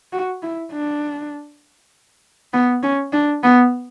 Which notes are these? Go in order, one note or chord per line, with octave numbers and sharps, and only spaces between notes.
F#4
E4
D4
B3
C#4
D4
B3